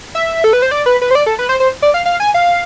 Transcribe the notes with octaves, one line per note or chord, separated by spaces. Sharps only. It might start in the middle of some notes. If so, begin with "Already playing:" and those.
E5
A4
B4
C5
D5
B4
B4
C5
D5
A4
B4
C5
C5
D5
F5
F5
G#5
F5